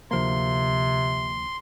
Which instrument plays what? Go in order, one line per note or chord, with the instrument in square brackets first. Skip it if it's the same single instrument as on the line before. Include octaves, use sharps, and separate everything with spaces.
[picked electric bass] D2 F3 A#3 [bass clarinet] C3 [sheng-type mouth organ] C6